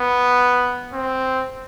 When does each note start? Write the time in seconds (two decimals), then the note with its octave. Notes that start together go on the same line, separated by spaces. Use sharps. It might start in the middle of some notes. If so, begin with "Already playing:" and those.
Already playing: B3
0.93 C4